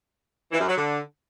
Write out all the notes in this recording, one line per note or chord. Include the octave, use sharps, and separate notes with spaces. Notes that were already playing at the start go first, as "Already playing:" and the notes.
E3
F#2
F#3
D3